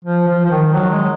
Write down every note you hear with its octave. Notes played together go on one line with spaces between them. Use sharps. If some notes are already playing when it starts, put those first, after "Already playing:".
F3
F3
F3
D#3
F#3
G#3